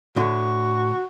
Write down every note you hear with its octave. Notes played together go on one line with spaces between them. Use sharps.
A2 D3 F#4